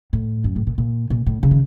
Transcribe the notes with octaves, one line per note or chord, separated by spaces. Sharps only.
A2
F#2
A2
A#2
A#2
A#2
A2
C#3
D#3